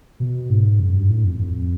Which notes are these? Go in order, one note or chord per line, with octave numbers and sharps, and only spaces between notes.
B2
G#2
F#2
G2
A2
F2
F2